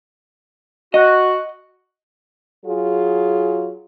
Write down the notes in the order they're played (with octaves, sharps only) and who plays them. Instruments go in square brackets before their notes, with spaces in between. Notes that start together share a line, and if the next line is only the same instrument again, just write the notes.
[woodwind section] F#4 [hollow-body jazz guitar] D#5
[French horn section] F#3 F4 G#4